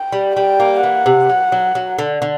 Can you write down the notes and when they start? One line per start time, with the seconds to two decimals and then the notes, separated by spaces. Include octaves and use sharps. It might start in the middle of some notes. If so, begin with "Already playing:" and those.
Already playing: G5
0.13 G3
0.36 G3 G5
0.60 A#3
0.83 E3 F#5
1.06 C3
1.30 F#3
1.52 F#3
1.75 F#3
1.98 D3
2.22 D3